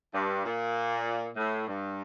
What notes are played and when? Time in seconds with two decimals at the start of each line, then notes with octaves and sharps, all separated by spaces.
0.14 G2
0.45 A#2
1.37 A2
1.68 G2